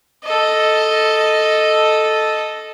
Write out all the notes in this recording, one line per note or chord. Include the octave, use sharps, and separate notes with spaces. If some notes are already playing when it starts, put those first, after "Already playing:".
A4 D#5